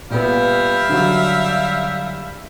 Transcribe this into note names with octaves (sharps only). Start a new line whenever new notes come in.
A#2 G3 B3 E5 F5
D3 F#3